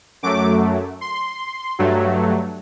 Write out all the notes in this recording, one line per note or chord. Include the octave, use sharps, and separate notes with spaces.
F#2 F#3 A3 D6
C6
G2 F#3 A3